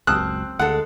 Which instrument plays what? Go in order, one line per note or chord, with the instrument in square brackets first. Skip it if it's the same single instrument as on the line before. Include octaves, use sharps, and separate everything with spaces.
[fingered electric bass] F#1 C#2 F#3 [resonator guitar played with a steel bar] C4 [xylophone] A5 D#6 F6 [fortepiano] F#6
[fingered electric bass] D2 [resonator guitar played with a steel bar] G#3 A4 [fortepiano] F#5